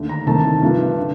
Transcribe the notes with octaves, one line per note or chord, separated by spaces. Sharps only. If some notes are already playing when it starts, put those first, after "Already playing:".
Already playing: D#2 D3 A3
A#5
C2 C3 D#3 A3 A5
G2 F3 A3
D3